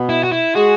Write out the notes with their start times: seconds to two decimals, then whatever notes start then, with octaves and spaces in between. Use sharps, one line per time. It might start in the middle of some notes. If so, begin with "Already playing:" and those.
Already playing: B2 B3
0.09 E4
0.24 F#4
0.32 E4
0.55 G#3 F#4 G#4